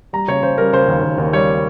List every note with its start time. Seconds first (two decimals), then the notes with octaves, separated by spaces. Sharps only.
0.13 G3 A#5
0.28 C#3 C#5
0.43 C#3 C5
0.58 G3 A#4
0.73 C#3 C5
0.88 D#2
1.03 D#2
1.18 D#2
1.33 G3 C#5